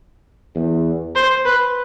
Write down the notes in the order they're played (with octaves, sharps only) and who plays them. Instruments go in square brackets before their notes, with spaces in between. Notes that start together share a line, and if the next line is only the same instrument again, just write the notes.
[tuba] E2
[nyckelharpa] C5
B4